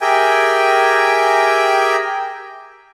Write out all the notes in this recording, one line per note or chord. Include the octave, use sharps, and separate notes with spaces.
G4 G#4 A#4 E5 G5 G#5